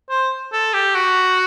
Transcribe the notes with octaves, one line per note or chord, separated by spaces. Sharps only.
C5
A4
G4
F#4